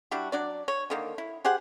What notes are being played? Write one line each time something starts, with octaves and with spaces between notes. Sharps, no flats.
G3 D4 E4 F#4
F#3 D4 D5
C#5
D3 D#3 A#3
E4
G4 G#4 C5 F#5